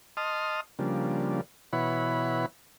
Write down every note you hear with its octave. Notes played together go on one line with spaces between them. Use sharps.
D#5 A5 C6 D#6 F6
C#3 F3 G3 A#3 D4
B2 E3 E4 C#5 F#5 B5